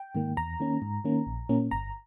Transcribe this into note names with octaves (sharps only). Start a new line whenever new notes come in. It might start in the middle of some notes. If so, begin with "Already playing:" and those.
Already playing: G5
G#2 D#3 A#3
E2 A#5
D#3 A#3 C#4
G#2
D#3 A#3 C#4
A#1
A#2 A#3 C#4
G1 A#5